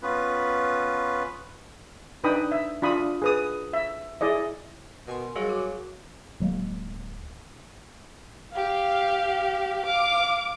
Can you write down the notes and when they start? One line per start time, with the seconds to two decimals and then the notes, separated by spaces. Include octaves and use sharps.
0.02 B3 C#4 F4 B4
2.24 D4 D#4 B4 G5 B5 D#6
2.52 E5
2.82 D4 F4 B5 D#6
3.22 G#4 B4 D#6
3.73 E5
4.21 E4 G#4 D5 D#5
5.07 B2 A#4 G#5 C6
5.36 F#3 G3 G#4 C#5 F5
5.49 F#4 D6
6.40 D1 F#3 G#3 A#3
8.52 G4 F5
9.86 F5 D6